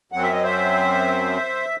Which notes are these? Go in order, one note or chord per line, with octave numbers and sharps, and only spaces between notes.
F#2 F#3 C4 F#5
E5
D#5
C5 E5